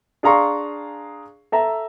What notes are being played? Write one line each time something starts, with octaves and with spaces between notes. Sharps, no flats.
D4 G#4 F5 A#5 C6 C#6
A4 E5 A#5